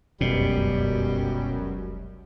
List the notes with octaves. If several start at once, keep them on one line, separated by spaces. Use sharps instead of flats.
F1 C#2 F#2 B2 G3